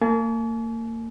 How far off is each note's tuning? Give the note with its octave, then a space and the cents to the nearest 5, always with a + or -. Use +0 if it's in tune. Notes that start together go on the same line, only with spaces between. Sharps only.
A#3 -35 G#5 +45